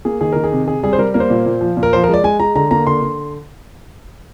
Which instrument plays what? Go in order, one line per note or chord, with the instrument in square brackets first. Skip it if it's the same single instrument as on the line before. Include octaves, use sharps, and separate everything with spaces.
[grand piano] A#3 G#4
D#3 G#4
D#3 A#4
G#4
C3
C3 G#4
G3 G#4
C5
G3 A#4
A#3 A#4
C5
A#2
A#2
F3
A#2
A#4
F3 C5
A#4
G#3 D5
G#3 G#5
G#3 A#5
D3 A#5
A#3 A#5
D3 C6
D3